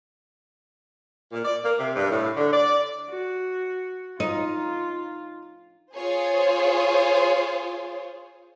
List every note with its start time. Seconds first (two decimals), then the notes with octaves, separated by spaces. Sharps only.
1.31 A#2
1.45 D5
1.63 A#3
1.79 C3
1.95 G2
2.10 A2
2.36 D3
2.52 D5
3.10 F#4
4.20 D#4 F4
5.94 F4 G#4 C5 C#5